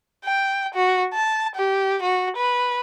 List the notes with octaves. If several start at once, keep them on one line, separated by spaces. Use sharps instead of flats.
G5
F#4
A5
G4
F#4
B4